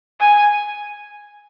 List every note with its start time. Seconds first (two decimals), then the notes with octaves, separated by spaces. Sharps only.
0.20 G#5